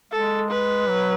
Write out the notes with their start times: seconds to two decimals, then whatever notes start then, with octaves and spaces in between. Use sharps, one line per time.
0.12 G#3 A4
0.50 B4
0.89 F#3